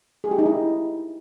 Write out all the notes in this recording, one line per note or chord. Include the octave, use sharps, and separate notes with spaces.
G#4
G4
D#4
E4